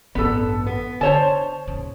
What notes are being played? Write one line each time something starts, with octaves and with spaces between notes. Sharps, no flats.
A1 G2 B3 A4
B3
D3 C5 C#5 A5
D#1 C#3